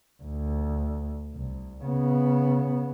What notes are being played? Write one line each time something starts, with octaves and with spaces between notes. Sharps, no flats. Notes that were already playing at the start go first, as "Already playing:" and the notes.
D2
C2
C#3 B3